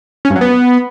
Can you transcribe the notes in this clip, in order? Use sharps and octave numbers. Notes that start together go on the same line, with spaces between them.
C#4
G2
F#3
B3